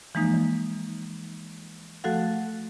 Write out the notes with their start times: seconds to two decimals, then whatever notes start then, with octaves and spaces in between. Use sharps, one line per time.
0.15 E3 F3 G#3 A#3 D#4
2.04 F3 A3 F#4 A4 F5 F#5